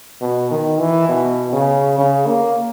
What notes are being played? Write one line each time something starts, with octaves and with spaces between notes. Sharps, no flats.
B2
D#3
E3
B2
C#3
C#3
A#3